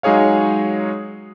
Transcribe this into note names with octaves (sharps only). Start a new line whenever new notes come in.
F#3 G#3 D#4 G#4 C#5 F5